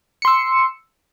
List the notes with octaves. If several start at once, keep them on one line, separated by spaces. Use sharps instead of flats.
C6 E6 C#7